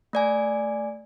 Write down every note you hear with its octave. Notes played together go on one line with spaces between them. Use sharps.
A3 D5 G#5